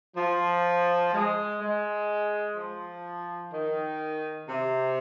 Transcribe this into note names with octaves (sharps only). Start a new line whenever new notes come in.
F3
G#3
G#3
F3
D#3
C3